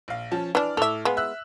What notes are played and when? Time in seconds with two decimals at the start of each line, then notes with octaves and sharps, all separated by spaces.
0.08 A#1 F5
0.31 F3 C#4 A5
0.55 E3 D4 D5 F6
0.77 A2 A4 E5 D6 F7
1.05 G#3 B3 F5
1.17 E5 E6 F#6